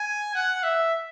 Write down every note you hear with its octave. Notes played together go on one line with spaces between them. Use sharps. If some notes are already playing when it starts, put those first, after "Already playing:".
Already playing: G#5
F#5
E5